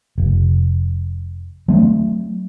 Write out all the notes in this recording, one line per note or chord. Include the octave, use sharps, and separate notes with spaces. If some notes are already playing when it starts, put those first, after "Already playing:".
F1
F#3 A3 C4